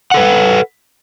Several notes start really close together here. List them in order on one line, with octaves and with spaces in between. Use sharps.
F#5 A4 B4